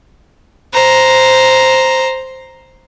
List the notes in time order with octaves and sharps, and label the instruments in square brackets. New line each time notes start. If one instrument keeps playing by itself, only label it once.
[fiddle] C5 A#5